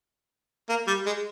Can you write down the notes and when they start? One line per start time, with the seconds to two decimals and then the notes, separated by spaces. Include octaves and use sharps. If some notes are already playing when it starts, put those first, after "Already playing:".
0.69 A#3
0.87 G3
1.06 G#3